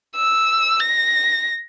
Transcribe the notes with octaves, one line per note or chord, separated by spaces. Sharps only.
E6
A#6